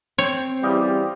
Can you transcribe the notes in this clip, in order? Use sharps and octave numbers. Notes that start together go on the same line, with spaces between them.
C4 C5 C#5
C#3 E3 G3 G4 D#5 F5